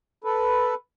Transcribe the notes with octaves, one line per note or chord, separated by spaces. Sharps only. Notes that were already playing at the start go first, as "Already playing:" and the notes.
A4 B4